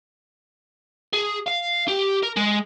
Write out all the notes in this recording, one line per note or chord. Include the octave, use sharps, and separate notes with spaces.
G#4
F5
G4
A#4
G#3